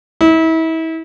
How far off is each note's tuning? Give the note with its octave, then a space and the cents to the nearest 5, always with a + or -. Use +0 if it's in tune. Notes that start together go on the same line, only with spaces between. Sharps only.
E4 -35